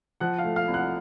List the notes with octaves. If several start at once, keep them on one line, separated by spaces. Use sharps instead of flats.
F3 F#5 F#6
F5 F6
A3
F5 F6
C2
F#5 F#6